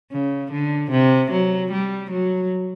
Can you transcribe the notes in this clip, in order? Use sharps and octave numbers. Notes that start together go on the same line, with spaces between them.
C#3
D3
C3
F#3
G3
F#3